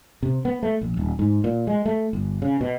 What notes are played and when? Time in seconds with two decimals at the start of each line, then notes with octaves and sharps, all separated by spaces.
0.23 C3
0.45 B3
0.63 A3
0.81 A#1
0.97 D#1
1.19 G#2
1.44 A#2
1.67 G#3
1.86 A3
2.13 G1
2.42 C#3
2.61 B2